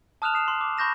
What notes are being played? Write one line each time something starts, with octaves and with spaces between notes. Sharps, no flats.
A5 D#6 F6 F#6 E7 F7
D#6 C7 E7
C6
D6
B5 C#6 G6 A#6 E7